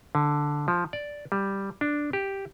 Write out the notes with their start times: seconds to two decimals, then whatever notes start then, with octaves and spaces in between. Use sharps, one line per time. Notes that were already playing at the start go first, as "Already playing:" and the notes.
0.15 D3
0.68 F3
0.93 D5
1.32 G3
1.81 D4
2.13 G4